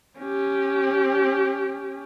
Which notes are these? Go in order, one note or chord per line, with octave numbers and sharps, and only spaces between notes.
C#4 G4